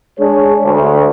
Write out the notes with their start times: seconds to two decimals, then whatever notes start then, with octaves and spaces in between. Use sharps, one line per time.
0.19 G#3 D4 G#4 C#5
0.63 D2